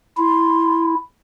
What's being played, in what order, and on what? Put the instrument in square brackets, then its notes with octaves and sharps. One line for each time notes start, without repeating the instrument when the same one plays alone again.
[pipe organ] E4 [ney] C6